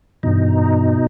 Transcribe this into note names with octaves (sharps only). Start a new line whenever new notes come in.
G2 B2 E3 D#4